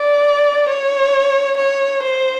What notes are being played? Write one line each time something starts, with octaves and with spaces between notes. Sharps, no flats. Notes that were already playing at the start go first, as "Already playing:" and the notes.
Already playing: D5
C#5
C#5
C5